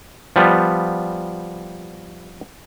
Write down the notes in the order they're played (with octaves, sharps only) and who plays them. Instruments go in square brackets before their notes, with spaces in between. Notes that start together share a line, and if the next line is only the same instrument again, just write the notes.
[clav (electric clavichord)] F3 G3 B3